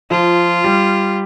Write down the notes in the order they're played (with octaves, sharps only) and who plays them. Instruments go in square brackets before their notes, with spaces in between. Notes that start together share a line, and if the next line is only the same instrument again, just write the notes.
[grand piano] F3 [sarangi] F4
[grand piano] G3